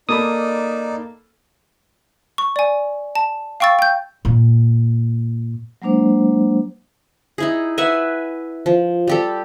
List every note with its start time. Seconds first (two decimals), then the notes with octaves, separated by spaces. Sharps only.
0.09 A#3 D#4 A4 D5 B5 D#6
2.38 C#6
2.56 D5 G#5
3.15 A5
3.60 F5 G5 C#6 E6 A6
3.79 G5 G6
4.25 A#2
5.82 F#3 G#3 A#3 D4 C5
7.38 D#4 E4 G#4
7.78 B4 E5 F#5 G#5
8.66 F3
9.08 G3 G4 A4